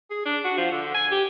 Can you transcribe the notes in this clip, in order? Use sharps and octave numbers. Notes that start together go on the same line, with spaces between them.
G#4
D4
F#4
F3
D3
G#5
G4